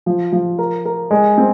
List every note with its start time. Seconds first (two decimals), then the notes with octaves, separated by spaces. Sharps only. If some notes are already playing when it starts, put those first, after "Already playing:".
0.06 F3
0.32 F3
0.58 A#4
0.85 A#4
1.11 G#3
1.38 C4